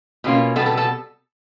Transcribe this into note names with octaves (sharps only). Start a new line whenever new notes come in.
B2 G3 A#3 C#4 F4
B2 G3 B3 A4 A5
A4 A5
A4 A5